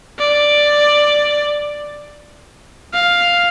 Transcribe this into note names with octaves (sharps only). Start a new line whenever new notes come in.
D5
F5